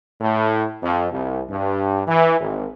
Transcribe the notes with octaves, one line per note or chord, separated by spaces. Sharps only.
A2
F2
C2
G2
E3
G#1